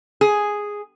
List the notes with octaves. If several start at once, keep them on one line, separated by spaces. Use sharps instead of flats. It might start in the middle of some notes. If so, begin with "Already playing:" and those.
G#4